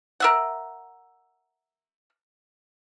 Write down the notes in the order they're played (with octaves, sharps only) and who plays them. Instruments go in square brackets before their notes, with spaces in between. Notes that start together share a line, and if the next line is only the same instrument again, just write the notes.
[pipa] A#4 E5 F#5